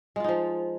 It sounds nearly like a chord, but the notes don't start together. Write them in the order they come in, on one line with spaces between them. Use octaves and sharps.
G#3 F4 D#4 F3